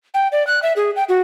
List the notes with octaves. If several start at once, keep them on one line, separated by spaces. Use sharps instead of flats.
G5
D5
F#6
E5
G#4
G5
F#4